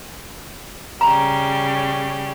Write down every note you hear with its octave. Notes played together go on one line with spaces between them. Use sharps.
C#3 G3 A#5